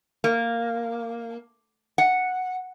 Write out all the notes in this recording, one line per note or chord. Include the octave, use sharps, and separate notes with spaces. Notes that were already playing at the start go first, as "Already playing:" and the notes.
A#3
F#5